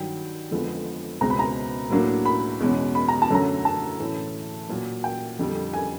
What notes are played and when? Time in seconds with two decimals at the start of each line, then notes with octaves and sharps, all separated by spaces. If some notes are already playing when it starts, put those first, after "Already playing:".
Already playing: G2 D#3 F#3 G5
0.51 F2 D3 F3 G#3 B3
1.21 C#2 B2 G#3 C4 A#5
1.30 B5
1.39 A#5
1.90 A2 F#3 A#3 D4
2.25 B5
2.60 E2 B2 G#3 C#4
2.95 B5
3.08 A#5
3.22 A5
3.30 F#2 D3 F#3 A3 C#4 A#5
3.65 A5
4.00 A2 E3 A3 C#4
4.69 A#2 F#3 A#3
5.04 G5
5.39 F2 D3 G3
5.73 G#5